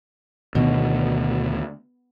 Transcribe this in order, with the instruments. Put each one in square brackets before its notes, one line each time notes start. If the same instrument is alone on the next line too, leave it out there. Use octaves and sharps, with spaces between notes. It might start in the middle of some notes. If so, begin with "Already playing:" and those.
[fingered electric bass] D2 D#3 B3 [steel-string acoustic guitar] B2